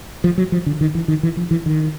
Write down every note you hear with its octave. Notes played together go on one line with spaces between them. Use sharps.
F3
F#3
F3
D3
D#3
E3
D#3
E3
F3
E3
D#3